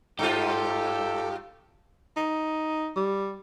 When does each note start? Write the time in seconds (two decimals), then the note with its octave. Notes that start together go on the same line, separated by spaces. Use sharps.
0.19 G2 F4 G4 A4 D6 E6
2.16 D#4
2.96 G3